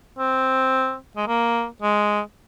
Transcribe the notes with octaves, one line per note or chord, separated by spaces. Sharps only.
C4
G#3
A#3
G#3